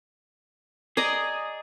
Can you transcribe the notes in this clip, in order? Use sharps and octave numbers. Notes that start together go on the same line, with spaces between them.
G#4 D5 D#5 A#5